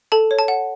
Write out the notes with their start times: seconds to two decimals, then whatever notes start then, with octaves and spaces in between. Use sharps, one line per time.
0.12 A4 A5
0.31 C#5
0.39 A5
0.48 F#5